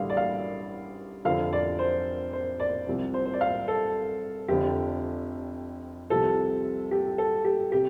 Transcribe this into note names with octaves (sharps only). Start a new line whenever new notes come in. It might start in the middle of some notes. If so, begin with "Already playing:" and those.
Already playing: A1 G2 D3 F5
D5
F5
F1 F2 D3 F3 F5
D5
C5
C5
D5
C2 C3 F3
C5
C5
D5
F5
A4
F1 F2 D3 F3 G4
C2 C3 F3 A4
G4
A4
G4
C3 G4